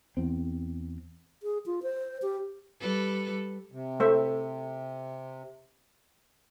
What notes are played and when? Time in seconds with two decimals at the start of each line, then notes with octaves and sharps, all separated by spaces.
0.17 E2 C4
1.43 G#4
1.66 F4
1.83 C5
2.22 G4
2.80 G3 A4 B4
3.72 C3
4.00 A3 C5 E5